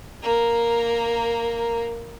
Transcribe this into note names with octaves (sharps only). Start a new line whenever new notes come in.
A#3 A#4